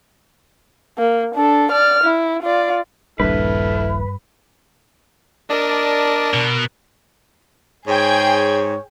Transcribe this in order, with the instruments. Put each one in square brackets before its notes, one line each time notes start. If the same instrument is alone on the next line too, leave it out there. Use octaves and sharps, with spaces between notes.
[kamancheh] A#3
D4 A4
D5 F6
E4
F4 D5
[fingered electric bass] D#1 A#1 [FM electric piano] G2 [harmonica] E4 A4 F6 [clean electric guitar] B4
[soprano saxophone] D4 [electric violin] A#4 [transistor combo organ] D5 D#5 A5
[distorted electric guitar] B2
[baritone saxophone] G#2 [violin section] G#4 G5 G#6 [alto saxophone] C#5